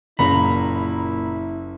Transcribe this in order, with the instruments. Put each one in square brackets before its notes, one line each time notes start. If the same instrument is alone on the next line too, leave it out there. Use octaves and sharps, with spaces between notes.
[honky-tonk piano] F#1 [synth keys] A#2 A#5 [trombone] E4 [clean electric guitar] B5